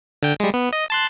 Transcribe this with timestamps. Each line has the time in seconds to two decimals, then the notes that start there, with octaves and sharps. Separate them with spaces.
0.23 D3 G5
0.40 G3 G#3
0.54 B3
0.73 D#5
0.90 A5 C6 F#6